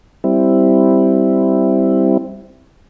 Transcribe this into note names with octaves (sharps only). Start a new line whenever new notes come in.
G3 C4 E4